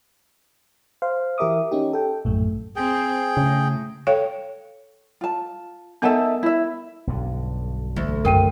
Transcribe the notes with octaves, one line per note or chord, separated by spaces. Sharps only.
C5 F5
E3 G4 A#4 E5 D6 D#6
C#4 D#4 G4
A4 G5
A#1 F#2 A2 A3
C4 G#4 G5
A2 C#3
A4 C#5 F5 G5
F4 A5
B3 D#4 A4 A#4 E5 F#5
E4 E5
B1 G2 D3
D2 E3 G3
F#2 D#3 A#4 G5 D#7